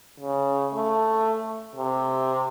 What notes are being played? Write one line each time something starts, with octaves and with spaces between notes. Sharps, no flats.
C#3
A3
C3